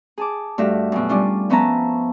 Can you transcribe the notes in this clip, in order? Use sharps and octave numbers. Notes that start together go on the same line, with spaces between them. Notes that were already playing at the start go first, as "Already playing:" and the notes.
G#4 A5 D6
G2 A3 F#4 E5 F6
F#2 B2
G3 C#4 D4 F4
F3 B3 C#4 E5 A5 A#5